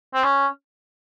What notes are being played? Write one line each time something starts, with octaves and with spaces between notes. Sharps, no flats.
C4
C#4